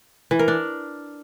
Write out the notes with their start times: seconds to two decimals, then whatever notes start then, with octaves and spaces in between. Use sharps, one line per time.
0.31 E3
0.39 A#4
0.48 D4